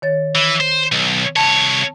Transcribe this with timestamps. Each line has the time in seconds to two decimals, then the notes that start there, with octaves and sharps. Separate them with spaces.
0.02 D#3 C#5 A6
0.35 E3
0.60 C5
0.92 B1
1.36 C2 C#5 A5